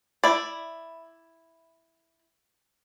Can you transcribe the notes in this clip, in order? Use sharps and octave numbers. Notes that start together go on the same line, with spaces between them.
E4 D5